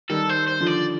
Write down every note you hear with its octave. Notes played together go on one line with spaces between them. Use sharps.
D#3 G3 A4
C5
C5
D3 F3
D5